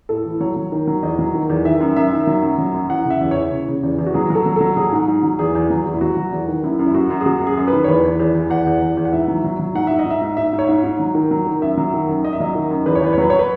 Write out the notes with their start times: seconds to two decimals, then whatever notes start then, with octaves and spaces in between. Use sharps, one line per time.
0.09 A2 A4
0.25 E3
0.40 F#3 C#5
0.56 F#3
0.72 D#3
0.87 F#3
1.03 E2 D#5
1.19 F#3
1.34 D#3
1.50 E2
1.65 D#3 E5
1.80 F#2
1.96 F#2 E5
2.13 D#3
2.27 F#3
2.43 F#2
2.58 F#3
2.74 F#2
2.90 E3 F#5
3.05 C#3
3.10 E5
3.21 E2
3.31 C#5
3.37 E3
3.52 C#3
3.68 C#3
3.83 E2
3.99 E2
4.06 F#4
4.14 F#3 G#4
4.30 F#3 A4
4.46 F#3
4.56 F#3 A4
4.77 F#3 G#4
4.92 G#2
5.08 G#2
5.23 F#3
5.39 E2 G#4
5.55 E2
5.70 F#3
5.86 E2
5.94 E4
6.01 F#3 F#4
6.17 F#3
6.32 E2
6.48 D#3
6.64 F#2 E4
6.79 F#2
6.86 E4
6.95 F#2 F#4
7.10 F#2
7.21 G#4
7.26 F#3 F#4
7.42 F#2 G#4
7.57 F#2
7.68 B4
7.73 D#3
7.84 C#5
7.88 E2 B4
8.04 E2
8.19 E2
8.35 E2
8.50 E2 F#5
8.67 E2
8.82 E2
8.97 E2
9.05 F#5
9.13 G#2 E5
9.28 F#3
9.44 F#3
9.59 F#3
9.75 G#2 F#5
9.87 G#2 E5
9.99 D#5
10.06 G#2 E5
10.22 G#2
10.37 G#2 E5
10.53 G#2
10.59 C#5
10.68 G#2
10.84 G#2
11.00 F#3
11.15 D#3
11.31 F#3
11.47 D#3
11.62 F#2 E5
11.78 F#3
11.94 D#3
12.09 F#2
12.25 F#2 D#5
12.33 E5
12.40 F#3 D#5
12.55 D#3
12.71 F#2
12.86 E2 B4
12.95 C#5
13.02 E2 B4
13.13 C#5
13.18 F#3 B4
13.30 C#5
13.39 B4